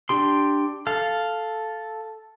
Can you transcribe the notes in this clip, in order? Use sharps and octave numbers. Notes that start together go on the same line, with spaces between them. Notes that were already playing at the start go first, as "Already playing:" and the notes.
D4 G4 C6
A4 F5